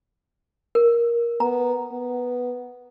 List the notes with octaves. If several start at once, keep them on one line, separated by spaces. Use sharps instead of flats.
A#4
B3 A#5
B3